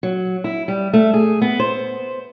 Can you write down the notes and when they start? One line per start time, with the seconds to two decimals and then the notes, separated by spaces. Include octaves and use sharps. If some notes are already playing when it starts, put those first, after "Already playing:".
0.03 F#3
0.44 E4
0.68 G3
0.93 A3
1.13 G#4
1.42 B3
1.60 C5